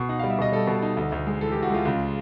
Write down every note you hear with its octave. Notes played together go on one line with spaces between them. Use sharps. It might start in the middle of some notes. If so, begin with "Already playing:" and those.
Already playing: B2
D#4 F#5
F5
G3
E5
B2 D#5
G3 A4
B2
D#4
D2
D2
G#3
E3 A4
G4
E3
F#4
G#3 F4
C#2